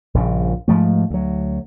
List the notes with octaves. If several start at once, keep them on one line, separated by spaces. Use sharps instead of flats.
A#1 G2 C#3
G#2 F3 A3
D2 F#3